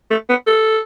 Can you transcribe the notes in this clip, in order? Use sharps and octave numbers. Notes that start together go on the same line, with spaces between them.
A3
B3
A4